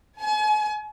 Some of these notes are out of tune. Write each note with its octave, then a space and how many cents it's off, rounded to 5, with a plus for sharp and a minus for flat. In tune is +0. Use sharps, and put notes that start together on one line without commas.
G#5 +40